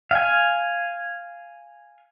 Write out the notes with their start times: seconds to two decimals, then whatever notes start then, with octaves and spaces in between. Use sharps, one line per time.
0.11 F5 G#5